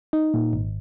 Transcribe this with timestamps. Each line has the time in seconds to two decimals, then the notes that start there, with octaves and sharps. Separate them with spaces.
0.13 D#4
0.34 A#2
0.53 G#1